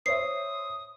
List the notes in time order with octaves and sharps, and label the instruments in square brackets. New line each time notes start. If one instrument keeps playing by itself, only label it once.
[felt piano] C5 C#5 E5 [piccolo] D#6 [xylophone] C7